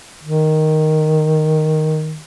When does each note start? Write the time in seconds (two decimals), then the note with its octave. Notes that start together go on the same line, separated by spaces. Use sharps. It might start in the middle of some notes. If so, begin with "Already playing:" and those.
0.23 D#3